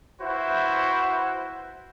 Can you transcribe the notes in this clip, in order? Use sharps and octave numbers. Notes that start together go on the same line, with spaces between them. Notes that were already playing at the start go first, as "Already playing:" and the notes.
E4 F#4 B4 C5 E5 F#5